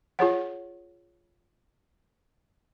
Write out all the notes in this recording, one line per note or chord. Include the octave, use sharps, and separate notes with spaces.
F4 G#4 C#5 F#5